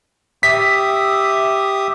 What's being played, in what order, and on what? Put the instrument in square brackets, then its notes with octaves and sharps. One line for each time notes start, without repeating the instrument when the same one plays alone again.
[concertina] G4 E5 D#6 [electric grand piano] B6